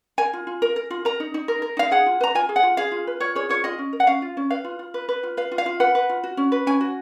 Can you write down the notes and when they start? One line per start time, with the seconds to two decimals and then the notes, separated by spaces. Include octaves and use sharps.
0.18 A#4 G#5
0.33 F4
0.47 F4
0.62 A#4
0.76 A#4
0.90 F4
1.05 A#4 A#5
1.20 D#4
1.34 D#4
1.48 A#4
1.62 A#4
1.77 D#4 F5
1.91 G#4 F#5
2.06 F4
2.21 B4 A#5
2.35 F4 G#5
2.49 G#4
2.56 F#5
2.63 F4
2.77 G#4 F5
2.92 F4
3.07 B4
3.20 F4 C#5
3.35 G#4 C#5
3.49 F4 C#5
3.64 F4 D#5
3.78 C#4
3.93 A#4
4.00 F#5
4.07 C#4 F5
4.22 F4
4.37 C#4
4.50 B4 F5
4.64 F4
4.79 F4
4.94 B4
5.09 B4
5.23 F4
5.37 B4 F5
5.52 F4
5.58 F5
5.66 F4
5.80 B4 F#5
5.95 B4
6.09 F4
6.24 F#4
6.37 C#4
6.52 B4
6.67 C#4 G#5
6.81 F#4